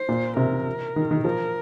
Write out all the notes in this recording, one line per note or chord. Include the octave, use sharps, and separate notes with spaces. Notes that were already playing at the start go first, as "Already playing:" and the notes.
Already playing: C5
A#2
C3 A#4
D#3
D#3
F3 A#4